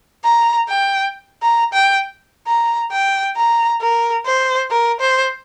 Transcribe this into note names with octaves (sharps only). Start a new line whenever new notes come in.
A#5
G5
A#5
G5
A#5
G5
A#5
A#4
C5
A#4
C5